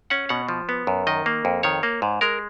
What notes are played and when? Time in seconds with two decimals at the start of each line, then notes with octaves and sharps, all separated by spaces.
0.10 C#4 F#5
0.29 B2 F#5
0.49 F3
0.69 B3
0.87 F#2
1.07 D#3 D#5
1.26 A#3
1.45 F2
1.63 D#3 C#5
1.83 A#3
2.02 G#2
2.21 G#3 A#4